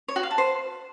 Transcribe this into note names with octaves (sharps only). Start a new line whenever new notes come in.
C#5
F#4
F5
A5
C5